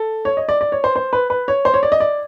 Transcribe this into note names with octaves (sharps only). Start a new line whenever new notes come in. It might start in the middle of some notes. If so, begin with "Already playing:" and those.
Already playing: A4
C#5
D#5
D5
D5
C#5
C5
C5
B4
B4
C#5
C5
C#5
D5
D#5
D5